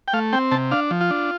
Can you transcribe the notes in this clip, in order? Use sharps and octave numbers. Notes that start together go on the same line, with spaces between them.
G5
A3 F5
C4 G5
C3 A5
D4 F5
F3
F4
D4